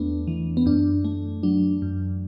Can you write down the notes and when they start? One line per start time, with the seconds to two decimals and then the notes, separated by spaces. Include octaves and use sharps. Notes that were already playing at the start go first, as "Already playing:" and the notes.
Already playing: E2 A3 B3 D4
0.28 E3
0.57 B3
0.66 F#2 D4
1.05 A3
1.43 F#3 D4
1.82 F#2